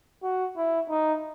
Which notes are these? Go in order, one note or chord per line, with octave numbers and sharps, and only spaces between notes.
F#4
E4
D#4